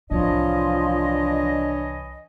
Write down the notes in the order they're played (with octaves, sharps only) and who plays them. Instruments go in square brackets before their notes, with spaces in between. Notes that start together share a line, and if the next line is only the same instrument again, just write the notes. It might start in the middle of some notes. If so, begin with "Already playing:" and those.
[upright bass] C2 A2 [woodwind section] E3 C#5 D#5 [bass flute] F3 [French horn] D4